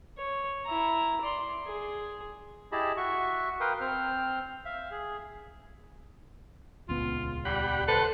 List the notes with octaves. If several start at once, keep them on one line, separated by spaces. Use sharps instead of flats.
C#5
E4 A#5
D5 C6
G#4
E4 G4 G#4 D#5 A5 B5
F#4 E5 C#6
A#4 B4 F5 G5 C6 D#6
C4 C5 F6
E5 F5
G#4
D#1 C#2 B3 F4
G3 G4 F#5 B5
A4 B4 C5 F#5